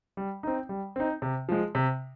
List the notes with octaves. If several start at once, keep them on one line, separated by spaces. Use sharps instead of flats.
G3
C4 D#4
G3
C4 D#4
C3
F3 G#3
C3